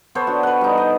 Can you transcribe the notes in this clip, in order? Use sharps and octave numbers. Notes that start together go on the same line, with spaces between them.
B3 A4 C5 C#5
D4 F#4
B4 F#5
G3 D#4
D#5